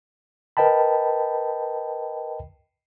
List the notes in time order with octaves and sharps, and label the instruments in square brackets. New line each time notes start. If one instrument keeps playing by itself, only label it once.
[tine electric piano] A#4 B4 D#5 G5 A5 B5